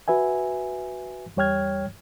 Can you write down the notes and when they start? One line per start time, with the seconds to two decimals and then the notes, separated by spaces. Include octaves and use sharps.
0.08 F#4 B4 E5 G#5
1.37 E2 G3 C#5 G5 F6 G#6